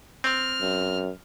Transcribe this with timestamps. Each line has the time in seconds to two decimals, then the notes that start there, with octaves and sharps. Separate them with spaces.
0.24 C4 F6
0.61 F#2